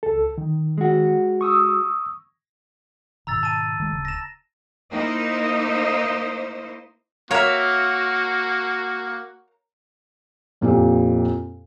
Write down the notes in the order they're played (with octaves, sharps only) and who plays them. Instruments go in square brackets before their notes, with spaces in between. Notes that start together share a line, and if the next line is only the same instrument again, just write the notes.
[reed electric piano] C#2 A4
D#3
[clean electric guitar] G#3 F#4
[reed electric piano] C#6 D#6 E6
[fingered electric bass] G#2 B2 D#3 [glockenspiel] A#5 E6 A6
[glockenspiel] A5 A6 D#7
[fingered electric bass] D#3 G#3
D1 C#3
[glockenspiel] A#6 E7
[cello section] A#3 D#4 E4 C5
[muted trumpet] A#3 [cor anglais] F#4 [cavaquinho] A#4 F5 [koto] C#5 E5
[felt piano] F2 A#2 E4 G4